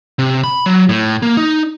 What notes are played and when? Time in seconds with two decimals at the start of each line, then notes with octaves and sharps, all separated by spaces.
0.19 C3
0.44 B5
0.66 F#3
0.89 A2
1.22 A#3
1.37 D#4